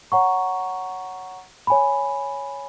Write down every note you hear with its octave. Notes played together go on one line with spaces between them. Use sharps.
C#5 F#5 A#5 C#6
C#5 G#5 B5